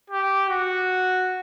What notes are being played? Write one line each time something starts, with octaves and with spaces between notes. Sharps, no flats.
G4
F#4